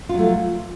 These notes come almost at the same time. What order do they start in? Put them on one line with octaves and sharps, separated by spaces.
F4 F#3 A3